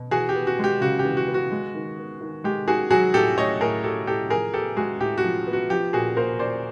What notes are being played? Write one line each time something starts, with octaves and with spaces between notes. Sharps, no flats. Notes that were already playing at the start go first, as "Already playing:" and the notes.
Already playing: B2
E3 F#4 G#4
G4
B3
F#4
G#3 G4
C#3 F#4
G4
E3
F#4
B3
F#4
G#3
D#3
B3
D#3
G#3 G4
D#3 F#4 G#4
F#3 F#4 G#4
A2 G4 A4
A3 C#5 D#5
A2 G#4 A#4
F#3 G4 A4
A2 G4 A4
F3 G#4 A#4
B3 G4 A4
G#3 F#4 G#4
A2 G4
F#4
F3
B3
F#4
F3 G4
A#2 F#4 G#4
A#3 A#4 C5
A#2 C5 D5